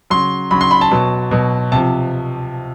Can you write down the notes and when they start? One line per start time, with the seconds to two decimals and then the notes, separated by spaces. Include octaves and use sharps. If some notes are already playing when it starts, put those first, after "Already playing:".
0.10 C#3 F#3 C6
0.51 C#3 F#3 B5
0.61 C6
0.71 B5
0.81 A5
0.91 B2 F#3
1.31 B2 F#3
1.72 C3 F3 A5